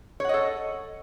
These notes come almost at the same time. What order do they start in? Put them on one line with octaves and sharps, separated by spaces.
C#5 F#5 D#5 A4